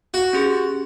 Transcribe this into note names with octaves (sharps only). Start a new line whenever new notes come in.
F#4
C#4 G4 G#4